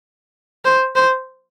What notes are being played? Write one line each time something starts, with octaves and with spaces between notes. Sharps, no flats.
C5
C5